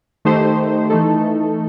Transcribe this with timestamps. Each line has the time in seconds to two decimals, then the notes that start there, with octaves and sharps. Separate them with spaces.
0.25 D#3 A3 D#4 G4 C5
0.90 E3 A3 D#4 A4